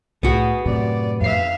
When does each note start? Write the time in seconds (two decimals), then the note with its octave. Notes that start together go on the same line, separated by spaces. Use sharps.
0.23 C2 A2 B3 F#4 G#4
0.66 F#2 A2 C3 D5
1.21 F2 E5 F5 C7